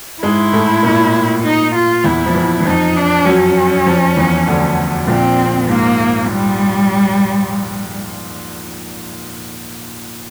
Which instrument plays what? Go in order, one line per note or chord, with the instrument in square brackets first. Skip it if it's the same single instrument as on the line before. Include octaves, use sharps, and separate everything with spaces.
[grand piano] G#2 G#3 [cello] E4
[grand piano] A2 A3
A#2 A#3
[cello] D#4
F4
[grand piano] E2 E3 [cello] E4
[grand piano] F3
E2 E3
E3
[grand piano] F2 F3 [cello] D#4
[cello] D4
[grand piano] F#2 F#3 [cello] C#4
[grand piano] F2 F3
E2 E3
D2 D3
[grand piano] A#1 A#2 [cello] C4
[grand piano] G#2 [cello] A#3
[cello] G3